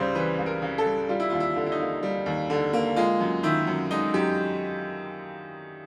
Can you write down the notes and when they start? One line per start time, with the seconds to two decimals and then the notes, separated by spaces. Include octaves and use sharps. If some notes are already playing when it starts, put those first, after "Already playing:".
Already playing: C#2 C#3 G3 C5
0.15 E3 B4
0.39 C#2
0.46 A#4
0.62 C#3
0.78 A4
0.85 G3
1.09 G3 F4
1.20 E4
1.30 D#2 F4
1.40 E4
1.56 D3
1.66 E4
1.72 D#4
1.80 A#3
2.03 G3
2.26 D#2
2.50 D3
2.73 A#3
2.96 G#3 F4
3.20 F#2
3.43 D#3 E4
3.67 F#2
3.91 G#3 D#4
4.14 F#2 G4